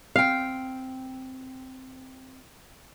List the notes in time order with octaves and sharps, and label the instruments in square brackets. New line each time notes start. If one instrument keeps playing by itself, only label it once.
[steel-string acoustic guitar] C4 G5 [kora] F5